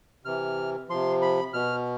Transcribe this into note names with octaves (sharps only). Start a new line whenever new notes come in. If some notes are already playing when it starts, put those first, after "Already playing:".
C3 E3 F6
C3 F3 C6
B5
B2 F6